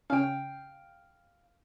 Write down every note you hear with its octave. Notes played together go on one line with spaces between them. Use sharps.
C#3 C#4 F5 G5